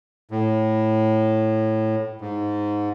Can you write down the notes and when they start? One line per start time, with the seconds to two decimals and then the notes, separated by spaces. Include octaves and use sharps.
0.31 A2
2.21 G#2